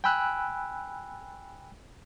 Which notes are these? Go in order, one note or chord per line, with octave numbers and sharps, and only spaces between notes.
G5 G#5 B5 E6 F#6